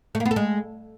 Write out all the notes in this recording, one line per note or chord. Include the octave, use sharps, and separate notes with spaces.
A3
A#3
B3
A4
G#3